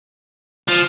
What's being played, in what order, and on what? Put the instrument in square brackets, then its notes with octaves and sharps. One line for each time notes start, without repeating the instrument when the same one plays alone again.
[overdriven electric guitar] F3